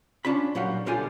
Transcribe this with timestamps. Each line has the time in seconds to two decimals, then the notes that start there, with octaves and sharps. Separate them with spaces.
0.25 C#4 D4 F4 B5
0.55 A#2 F#3 G3 F5 F#5
0.86 B1 D3 G3 F4 G4 G#5